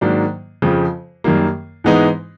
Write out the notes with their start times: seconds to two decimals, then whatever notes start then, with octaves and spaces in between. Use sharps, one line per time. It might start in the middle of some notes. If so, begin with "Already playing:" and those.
0.01 G#2 D#3 F#3 A#3 D4
0.62 F2 C#3 F3
1.24 F#2 D#3 G3 A#3
1.84 G#2 E3 G#3 B3 D#4